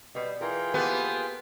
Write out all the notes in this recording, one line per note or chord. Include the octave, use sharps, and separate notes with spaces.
B2 G3 B4
E3 F4 G#4 A#4 G5
A#3 B3 G4 A4